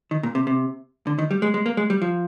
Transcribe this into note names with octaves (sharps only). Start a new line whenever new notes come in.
D#3
A#2
C3
C3
D3
D#3
G3
G#3
G#3
A#3
G#3
G3
F3